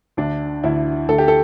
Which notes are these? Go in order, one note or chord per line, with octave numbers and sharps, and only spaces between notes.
D2 D4
D2 E4
D2 A4
G4
A4